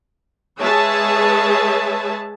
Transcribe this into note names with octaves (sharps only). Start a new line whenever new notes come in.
G#3 G#4 B4 C#5 E5 A5